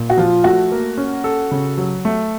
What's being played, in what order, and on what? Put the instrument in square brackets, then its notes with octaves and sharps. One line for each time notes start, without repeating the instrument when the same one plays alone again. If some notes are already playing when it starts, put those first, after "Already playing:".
Already playing: [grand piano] A#2
[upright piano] F#4
[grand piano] F3 [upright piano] F4
[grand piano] A3 [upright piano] F#4
[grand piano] A#3
C#4
A4
C#3
F#3
A3